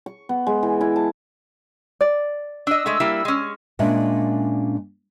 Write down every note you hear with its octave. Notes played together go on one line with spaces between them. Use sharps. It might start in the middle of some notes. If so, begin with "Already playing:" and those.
C#6
B3
G#3
E3
E4
A5
D5
D4 D#5 E6
G#3 A3
G3 A#3 E4
G#3 C#4
A#2 G#3 C#4 D4 D5 E5